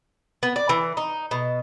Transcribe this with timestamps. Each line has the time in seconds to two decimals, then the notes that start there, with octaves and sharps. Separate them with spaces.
0.43 B3
0.56 D5
0.69 E3
0.97 D#4
1.31 B2